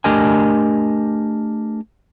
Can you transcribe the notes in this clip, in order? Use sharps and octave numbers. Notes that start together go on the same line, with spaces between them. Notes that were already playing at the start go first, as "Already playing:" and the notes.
A3 D4 G4 A#4 D#5 G#5